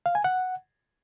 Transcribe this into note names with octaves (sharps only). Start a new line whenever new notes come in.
F5
G#5
F#5